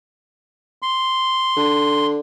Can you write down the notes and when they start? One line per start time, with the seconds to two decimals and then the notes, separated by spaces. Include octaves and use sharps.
0.82 C6
1.56 D3